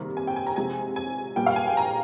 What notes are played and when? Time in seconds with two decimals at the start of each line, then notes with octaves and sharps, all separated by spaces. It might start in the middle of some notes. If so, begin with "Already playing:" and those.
Already playing: C3 D#3 G3 A#3
0.17 G#5
0.27 G5
0.36 G#5
0.46 A#5
0.56 C3 F3 G#3 G#5
0.96 G#5
1.36 A#2 G3 A#3 G5
1.46 F5
1.56 G#5
1.67 G5
1.77 A#5